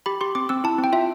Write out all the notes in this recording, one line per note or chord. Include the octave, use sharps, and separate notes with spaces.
G4 B5
G4 C6
C4 D6
C4 E6
E4 A5
C4
G5
F4 E5